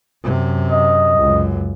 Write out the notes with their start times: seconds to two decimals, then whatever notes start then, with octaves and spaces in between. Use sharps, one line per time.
0.24 F#2 C3
0.71 D#5
1.18 C#2 F#2